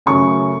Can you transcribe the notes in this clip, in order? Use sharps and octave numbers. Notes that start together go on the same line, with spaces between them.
F#2 C#3 A3 C#4 C#6